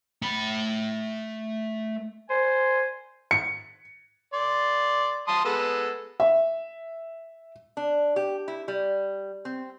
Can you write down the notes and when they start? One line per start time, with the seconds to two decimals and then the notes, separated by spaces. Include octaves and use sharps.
0.22 A3 B5
2.30 C5 G#5
3.31 C#7
4.34 D5 C6
5.28 A5 C6 D#6
5.45 G#3 B3 A4
6.20 E5
7.77 D4
8.16 G4
8.48 E4
8.68 G3
9.45 C4